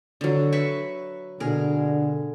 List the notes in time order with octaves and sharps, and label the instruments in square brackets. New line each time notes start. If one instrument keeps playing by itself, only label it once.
[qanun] D3 F#3
B4 E5 C#6
[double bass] B2 [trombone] D3 [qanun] G#4 A#4